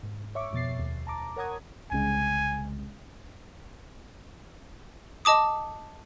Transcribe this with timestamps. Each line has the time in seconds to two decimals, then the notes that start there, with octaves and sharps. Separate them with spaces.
0.03 G#2
0.35 C#5 E5 C#6 D6
0.53 F2 B2 A6 C7
0.79 D#2
1.07 A5 A#5 D6
1.36 A#4 C#5 F#5 A#5 D#6 G#6
1.91 C2 C#3 G#3 G#5
5.25 D#5 A5 D6 D#6